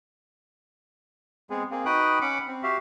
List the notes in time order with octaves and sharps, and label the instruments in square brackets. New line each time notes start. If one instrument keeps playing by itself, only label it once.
[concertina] G#3 B3 C4 G#4
A#3 C4 G#4
D#4 F#4 B4 G5 D#6 F#6
C#4 F#5 B5 D6
C4
F#4 G4 E5 F5